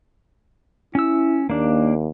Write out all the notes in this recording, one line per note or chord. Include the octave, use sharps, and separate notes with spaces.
C#4 E4 E6
D#2 A#3 D4